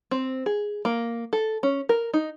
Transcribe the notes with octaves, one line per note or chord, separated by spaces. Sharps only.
C4
G#4
A#3
A4
C#4
A#4
D#4